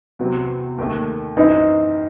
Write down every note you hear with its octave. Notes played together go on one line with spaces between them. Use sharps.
E2 C3 F#3 C4
D#2 D#3 A3
F#2 E3 C4 D#4 E4 C5